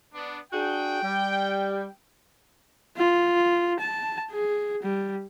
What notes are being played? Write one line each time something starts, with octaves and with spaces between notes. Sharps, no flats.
B3 D4
D4 F#4 G#4 G5
G3
F4
A5
G#4
G3